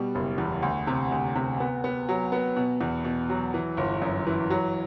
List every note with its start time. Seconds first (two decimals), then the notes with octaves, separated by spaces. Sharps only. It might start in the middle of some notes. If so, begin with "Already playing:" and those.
Already playing: B2 G3
0.15 F#1
0.38 E2
0.62 D2
0.87 C3
1.12 D2
1.35 C3
1.60 B3
1.84 B3
2.09 F#3
2.32 B3
2.56 B2
2.81 E2
3.05 B2
3.29 F#3
3.54 E3
3.77 G1
4.02 F#2
4.27 E3
4.50 F#3